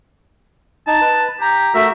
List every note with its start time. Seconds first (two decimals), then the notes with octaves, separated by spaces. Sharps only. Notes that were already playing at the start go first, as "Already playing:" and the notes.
0.87 D#4 A5
1.01 B4
1.41 G4 A#5
1.74 A3 F#4 A#4 E5